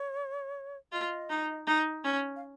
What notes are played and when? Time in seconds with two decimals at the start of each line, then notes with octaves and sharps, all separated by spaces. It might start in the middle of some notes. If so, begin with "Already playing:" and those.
Already playing: C#5
0.92 F4 D#5
1.29 D#4
1.67 D#4
2.04 C#4
2.36 F5